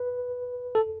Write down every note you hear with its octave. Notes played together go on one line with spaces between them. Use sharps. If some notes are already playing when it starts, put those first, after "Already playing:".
Already playing: B4
A4